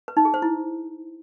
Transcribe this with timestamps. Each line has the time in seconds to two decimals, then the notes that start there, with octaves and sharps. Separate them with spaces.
0.08 B4
0.17 D#4
0.25 G#4
0.34 C5
0.42 E4